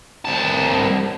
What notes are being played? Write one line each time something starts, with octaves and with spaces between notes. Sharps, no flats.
C2 A5